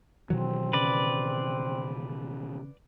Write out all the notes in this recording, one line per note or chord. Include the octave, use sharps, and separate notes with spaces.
B2 D#3 E3 F#3 C4
C#3 B4 D5